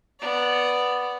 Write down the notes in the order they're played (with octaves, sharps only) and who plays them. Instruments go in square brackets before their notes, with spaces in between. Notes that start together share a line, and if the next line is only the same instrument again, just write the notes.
[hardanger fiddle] B3 D5